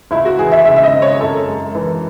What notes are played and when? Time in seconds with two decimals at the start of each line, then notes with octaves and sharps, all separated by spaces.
0.11 C#2 E4
0.25 F#4
0.39 E3 G#4
0.52 E5
0.65 C#3 E5
0.76 E5
0.83 D#5
0.94 C4
1.02 C#5
1.21 F#2 A4
1.48 G#3
1.75 E3